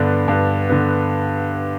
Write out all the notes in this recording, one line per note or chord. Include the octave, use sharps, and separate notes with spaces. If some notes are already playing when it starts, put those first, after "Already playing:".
Already playing: G2 D3 B3 D4
G2
D3 B3